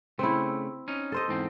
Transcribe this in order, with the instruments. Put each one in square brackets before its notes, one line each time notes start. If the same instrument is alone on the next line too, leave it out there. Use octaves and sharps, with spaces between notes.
[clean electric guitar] C#3 A3 [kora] C4 E4
[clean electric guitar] C#4 D#4
[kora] A4 C5 D#5
[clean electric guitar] E2 G#2 C4